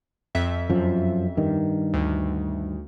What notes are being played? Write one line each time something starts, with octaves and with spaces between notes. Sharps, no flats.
F2 E5
F#2 F3
G2 D#3
D2